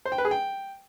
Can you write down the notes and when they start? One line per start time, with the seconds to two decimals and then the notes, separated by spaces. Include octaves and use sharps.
0.05 C5
0.12 G5
0.18 B4
0.25 G#4
0.31 G5